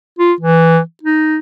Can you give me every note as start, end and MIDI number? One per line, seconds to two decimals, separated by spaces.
0.19 0.33 65
0.41 0.79 52
1.03 1.39 63